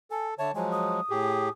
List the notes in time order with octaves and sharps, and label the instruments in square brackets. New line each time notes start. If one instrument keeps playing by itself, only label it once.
[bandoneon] A4 [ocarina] G#5
[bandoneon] D3 C#5 A5 [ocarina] E5
[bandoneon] F3 F#3 G#3 [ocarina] G#5
[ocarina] D#6
[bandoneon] A2 G4 G#4